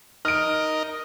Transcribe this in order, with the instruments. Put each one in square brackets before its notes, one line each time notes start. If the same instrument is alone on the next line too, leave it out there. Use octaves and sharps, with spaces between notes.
[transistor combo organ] D#4 A#4 D#5 [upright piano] F6 D7